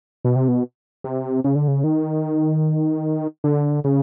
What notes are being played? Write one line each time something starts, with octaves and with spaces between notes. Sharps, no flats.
B2
C3
B2
C3
C#3
D3
C#3
D#3
D3
C#3